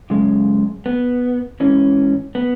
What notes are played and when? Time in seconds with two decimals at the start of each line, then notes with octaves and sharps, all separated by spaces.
0.10 F#2 C#3 G#3
0.86 B3
1.60 G#2 E3 C#4
2.35 B3